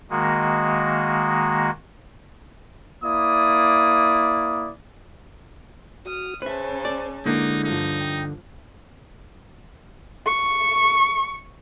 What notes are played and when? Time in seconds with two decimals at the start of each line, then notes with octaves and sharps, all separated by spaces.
0.10 D#3 G#3 A#3 F#4
3.04 A#3 E4 D5 D#6
6.06 F#4 D#6 F6
6.42 C#3 C#4 B4 C5 E5 A5
6.85 D5
7.26 D3 G#3 A#3 D#4 E4
7.64 G2 F3 D#4
8.01 G5
10.26 C#6